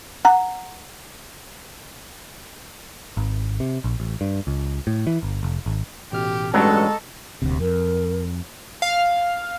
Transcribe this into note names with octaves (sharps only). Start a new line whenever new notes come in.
F#5 A#5
G#1
C3
A#1
A1
G2
C#2
A2
E3
G1
F1
G#1
A1 B2 G4 F6
A1 G2 F#3 G#3 A4 D#5 A#5 C#6
D#1 D2 C3
F2 A#4
F5